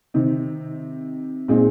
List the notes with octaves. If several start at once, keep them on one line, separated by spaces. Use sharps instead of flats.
C3 D#3 C4 D#4
A#2 G#3 C4 D#4